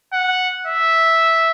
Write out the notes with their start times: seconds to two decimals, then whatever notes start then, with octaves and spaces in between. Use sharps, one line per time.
0.13 F#5
0.67 E5